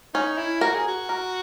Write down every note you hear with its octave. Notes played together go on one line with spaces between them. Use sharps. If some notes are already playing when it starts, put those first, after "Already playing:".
C#4 D#4
E4
F#4 A#4
G#4
F#4
A#4